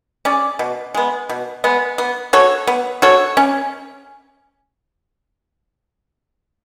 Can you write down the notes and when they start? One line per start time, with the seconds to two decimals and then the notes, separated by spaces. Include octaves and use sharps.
0.25 C#4 G#4 D5
0.59 B2
0.94 G#3 B3
1.29 B2
1.64 G#3 B3
1.98 B3
2.33 F#4 A4 C#5
2.67 B3
3.02 F#4 A4 C#5
3.37 C#4